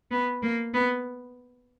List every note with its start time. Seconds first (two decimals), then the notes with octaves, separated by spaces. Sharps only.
0.11 B3
0.42 A#3
0.74 B3